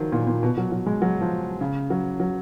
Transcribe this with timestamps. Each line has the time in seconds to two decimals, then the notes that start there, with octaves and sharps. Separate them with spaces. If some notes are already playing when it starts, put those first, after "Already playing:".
Already playing: D#3 F3 F#3
0.12 A#2
0.27 A#2
0.43 B2
0.58 F#3
0.72 F#3
0.86 G#3
1.02 F#3
1.21 F3
1.61 C#3
1.90 F#3
2.20 F#3